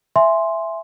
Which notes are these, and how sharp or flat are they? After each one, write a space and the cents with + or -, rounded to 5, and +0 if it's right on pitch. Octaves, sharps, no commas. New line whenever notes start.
E5 +10 G#5 +0 C6 +0